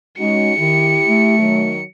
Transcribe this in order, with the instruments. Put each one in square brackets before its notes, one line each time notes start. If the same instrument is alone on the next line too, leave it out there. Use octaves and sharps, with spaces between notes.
[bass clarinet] G#3 [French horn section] C#4 D#4 F#4 [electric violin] C#7
[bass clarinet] D#3 [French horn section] E4 G4
[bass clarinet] A3
[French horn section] D#3 F#3